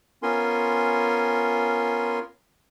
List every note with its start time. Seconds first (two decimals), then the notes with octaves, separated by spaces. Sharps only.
0.23 B3 C#4 F4 A#4 G#5 C6